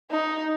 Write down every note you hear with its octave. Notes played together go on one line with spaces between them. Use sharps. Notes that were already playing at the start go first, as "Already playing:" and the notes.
D#4